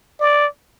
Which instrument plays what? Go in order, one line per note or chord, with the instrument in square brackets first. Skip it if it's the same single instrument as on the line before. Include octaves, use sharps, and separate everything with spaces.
[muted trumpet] D5